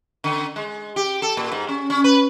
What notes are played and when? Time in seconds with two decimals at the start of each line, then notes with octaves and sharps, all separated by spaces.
0.24 D3
0.56 G#3
0.96 G4
1.22 A4
1.37 A#2
1.52 G#2
1.68 C#4
1.90 C#4
2.04 B4